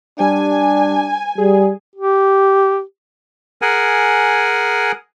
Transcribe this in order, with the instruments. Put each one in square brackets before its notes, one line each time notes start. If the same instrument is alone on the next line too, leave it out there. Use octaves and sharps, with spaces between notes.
[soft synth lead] G3 [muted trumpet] D4 [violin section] G#5
[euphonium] G3 [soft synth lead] G#4
[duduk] G4
[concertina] G#4 A#4 F#5 G#5